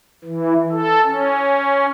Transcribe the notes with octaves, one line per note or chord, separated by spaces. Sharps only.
E3
A4
C#4